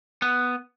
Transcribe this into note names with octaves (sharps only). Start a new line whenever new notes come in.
B3